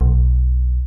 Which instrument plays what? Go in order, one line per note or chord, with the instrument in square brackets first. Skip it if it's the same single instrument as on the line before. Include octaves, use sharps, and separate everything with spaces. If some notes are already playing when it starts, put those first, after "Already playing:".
[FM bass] B1